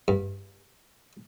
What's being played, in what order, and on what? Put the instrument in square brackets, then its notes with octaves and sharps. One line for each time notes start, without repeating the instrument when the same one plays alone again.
[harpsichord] G2